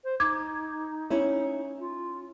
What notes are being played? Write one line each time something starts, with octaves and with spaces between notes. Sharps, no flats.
C5
D#4 D6 G#6
C#4 E4
F4